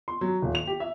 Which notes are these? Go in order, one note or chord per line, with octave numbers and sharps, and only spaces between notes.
C6
F#3
D#1
F7
G4
E5